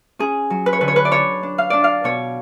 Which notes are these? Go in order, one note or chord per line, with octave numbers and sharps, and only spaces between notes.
C#4 G#4
F#3
B4
C#5
D3 B4
C#5
B4
D5
D4 C#5
D4
F5
D4 D5
F5
B2 C#5